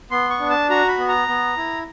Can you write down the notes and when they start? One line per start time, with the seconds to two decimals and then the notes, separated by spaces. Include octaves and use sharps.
0.11 B3 C6
0.30 C#6
0.40 D4
0.50 A5
0.70 F#4 A#5
0.88 B5
0.98 B3
1.09 A#5
1.28 B3
1.57 E4